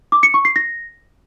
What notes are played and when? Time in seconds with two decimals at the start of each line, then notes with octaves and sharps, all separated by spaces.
0.12 D6
0.23 C#7
0.34 C#6
0.45 C7
0.56 A#6